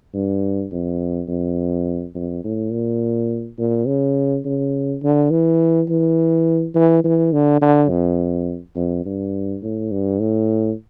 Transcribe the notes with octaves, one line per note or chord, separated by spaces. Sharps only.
G2
F2
F2
F2
A2
A#2
A#2
C#3
C#3
D3
E3
E3
E3
E3
D3
D3
F2
F2
G2
A2
G2
A2